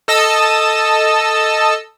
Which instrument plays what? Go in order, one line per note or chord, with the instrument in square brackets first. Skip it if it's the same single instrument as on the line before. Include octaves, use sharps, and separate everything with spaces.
[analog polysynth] A4 D#5 A5 E6